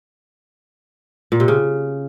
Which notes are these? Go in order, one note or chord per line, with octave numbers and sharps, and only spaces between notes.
A#2
C3
C#3